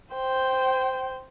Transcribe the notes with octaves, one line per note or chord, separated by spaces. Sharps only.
C5 G5